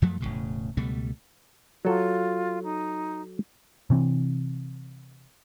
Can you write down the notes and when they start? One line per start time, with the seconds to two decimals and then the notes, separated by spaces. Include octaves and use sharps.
0.02 F#2 F3 F#3 A3
0.20 E1 B1 A2 C#3
0.77 C#2 B2 G3 A3
1.85 F#3 F4 A4
2.64 D#4
3.90 C3 E3 C4